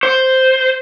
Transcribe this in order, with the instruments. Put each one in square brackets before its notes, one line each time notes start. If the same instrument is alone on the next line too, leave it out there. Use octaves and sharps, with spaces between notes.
[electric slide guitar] C5